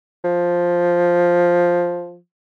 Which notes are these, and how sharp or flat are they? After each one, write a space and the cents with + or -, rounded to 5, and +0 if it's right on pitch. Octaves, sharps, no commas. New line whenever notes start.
F3 +5